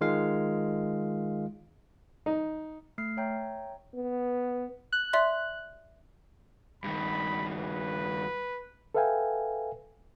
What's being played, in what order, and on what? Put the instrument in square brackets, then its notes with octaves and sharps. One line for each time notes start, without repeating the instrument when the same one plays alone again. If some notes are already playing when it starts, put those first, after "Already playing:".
[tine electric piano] D#3 G#3 F4 F5
[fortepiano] D#4
[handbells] A3 F6 C7
C#5 E5 G5 A#5 G6
[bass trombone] B3
[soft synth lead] F#6
[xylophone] D5 E5 C6
[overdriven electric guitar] G2 D#3 [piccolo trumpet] B5
[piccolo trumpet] B4
[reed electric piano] A4 B4 E5 F5 G5 G#5